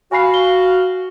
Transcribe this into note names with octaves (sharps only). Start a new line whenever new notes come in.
F#4 F5 G#5 B5 C7
G7